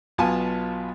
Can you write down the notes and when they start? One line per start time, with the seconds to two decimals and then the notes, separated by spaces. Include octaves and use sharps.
0.18 B1 B2 B3 F4 G#5 A5